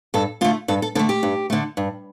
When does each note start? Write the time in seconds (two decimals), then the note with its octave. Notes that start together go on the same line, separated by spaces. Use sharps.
0.14 G2 A4
0.41 D3 A3 F4
0.68 G2 A4
0.82 A4
0.95 D3 A4
0.99 A3
1.09 G4
1.23 G2
1.50 D3 A3
1.77 G2